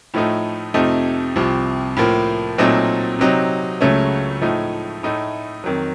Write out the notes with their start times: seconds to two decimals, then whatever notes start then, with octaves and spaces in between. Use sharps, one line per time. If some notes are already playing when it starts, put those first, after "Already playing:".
0.14 A2 F3 A3 D#4
0.74 F2 C3 F3 A3 D#4
1.36 C2 C3 F3
1.97 A2 F3 A#3
2.58 A#2 F#3 A3 C4 D#4
3.19 C3 F#3 C4 D#4
3.81 C#2 C#3 F#3 A3 C#4
4.41 A2 F3 A3 D#4
5.03 A2 A3 D#4
5.64 F2 D#3 F#3